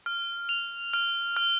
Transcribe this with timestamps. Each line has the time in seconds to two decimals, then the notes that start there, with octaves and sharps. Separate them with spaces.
0.06 F6
0.49 F7
0.93 F6
1.37 F6